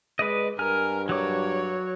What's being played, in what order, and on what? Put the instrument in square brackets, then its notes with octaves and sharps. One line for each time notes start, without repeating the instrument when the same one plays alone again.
[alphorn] G#3 [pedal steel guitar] B4 D5 D#5
[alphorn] G2 [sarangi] A#4 [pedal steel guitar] G#5 F6
[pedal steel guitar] F#3 D6 [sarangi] C#5